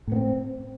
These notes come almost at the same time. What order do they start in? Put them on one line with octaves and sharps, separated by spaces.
A2 B3 C4